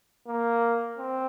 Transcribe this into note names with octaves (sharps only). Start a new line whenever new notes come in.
A#3
C4